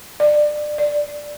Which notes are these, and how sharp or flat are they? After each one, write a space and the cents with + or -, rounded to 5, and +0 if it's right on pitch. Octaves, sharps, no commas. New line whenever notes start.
D5 +25
D5 +0